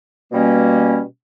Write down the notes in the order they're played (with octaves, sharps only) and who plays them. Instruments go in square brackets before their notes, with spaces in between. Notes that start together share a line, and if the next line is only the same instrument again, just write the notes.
[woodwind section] B2 G3 A#3 C#4